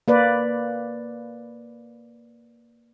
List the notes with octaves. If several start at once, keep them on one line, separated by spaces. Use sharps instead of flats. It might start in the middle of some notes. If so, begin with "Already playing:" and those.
A#3 B4 D5